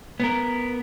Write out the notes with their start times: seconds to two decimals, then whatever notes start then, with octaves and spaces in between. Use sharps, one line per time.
0.20 B3 A#4